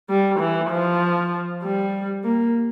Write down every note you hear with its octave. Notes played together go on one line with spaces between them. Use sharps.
G3
E3
F3
G3
A#3